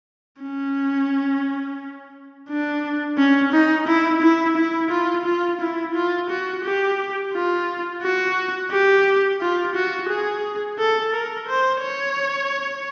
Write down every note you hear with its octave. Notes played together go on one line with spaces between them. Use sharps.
C#4
D4
C#4
D#4
E4
E4
E4
F4
F4
E4
F4
F#4
G4
F4
F#4
G4
F4
F#4
G#4
A4
A#4
C5
C#5